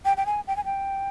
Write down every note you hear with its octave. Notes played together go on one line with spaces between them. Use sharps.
G5
G5
G#5
G5
G#5
G5